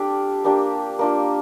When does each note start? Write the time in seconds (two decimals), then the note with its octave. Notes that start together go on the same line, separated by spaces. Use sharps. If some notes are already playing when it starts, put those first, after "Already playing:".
Already playing: C4 D4 F4 G4 A4 D5
0.45 A#3 D4 G4
0.99 A#3 D4 F4